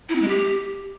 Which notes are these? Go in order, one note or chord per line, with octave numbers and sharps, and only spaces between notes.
E4
C4
G#3
G4